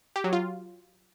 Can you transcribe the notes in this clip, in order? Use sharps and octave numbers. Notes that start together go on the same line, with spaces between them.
G4
F#3
F4